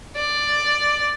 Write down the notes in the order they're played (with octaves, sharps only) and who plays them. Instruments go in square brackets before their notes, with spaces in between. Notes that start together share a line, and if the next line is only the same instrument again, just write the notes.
[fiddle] D5